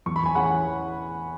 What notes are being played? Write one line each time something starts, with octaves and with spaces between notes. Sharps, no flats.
E2 C#6
B5
G#5
E3 C#4 E4 G#4 F#5 B5